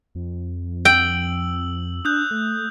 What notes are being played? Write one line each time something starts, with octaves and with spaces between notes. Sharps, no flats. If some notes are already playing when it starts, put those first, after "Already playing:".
F2
G5 E6 F#7
D4 D#6 F#6 G6
A3